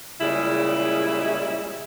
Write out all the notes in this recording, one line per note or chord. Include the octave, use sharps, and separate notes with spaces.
A#2 C#3 G3 G#3 E4